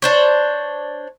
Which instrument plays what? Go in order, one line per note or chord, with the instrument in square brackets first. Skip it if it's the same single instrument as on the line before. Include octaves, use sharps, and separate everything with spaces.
[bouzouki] D4 C5 C#5